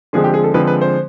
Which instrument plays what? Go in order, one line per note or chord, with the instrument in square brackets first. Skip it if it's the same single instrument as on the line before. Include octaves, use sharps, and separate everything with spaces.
[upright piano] D3 F3 G#3 C4 G#4
G4
G#4
A4
D3 F3 G#3 C4 B4
B4
C5